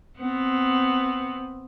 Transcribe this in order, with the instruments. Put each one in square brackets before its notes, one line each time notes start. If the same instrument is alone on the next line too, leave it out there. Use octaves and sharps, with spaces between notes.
[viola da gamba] B3 C4